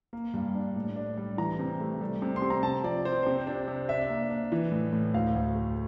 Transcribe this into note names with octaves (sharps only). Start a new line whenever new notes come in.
A#3
G2
D4
A2
D4
G3
E3 A#5
C3
A3
G3
C3
C6
C3
A#5
C3 A5
F3 D5
C4 C5
C3 C5
D4
C3
D4 E5
A#3
D4
E3
A2
A2
D2 F5
D2
A3